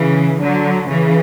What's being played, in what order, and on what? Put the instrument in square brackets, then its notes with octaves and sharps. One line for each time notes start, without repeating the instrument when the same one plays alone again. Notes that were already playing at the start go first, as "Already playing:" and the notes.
Already playing: [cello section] C#3 E3
D3 F#3
C#3 E3